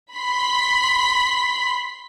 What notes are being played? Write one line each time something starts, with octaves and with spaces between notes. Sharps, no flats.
B5 C6 B6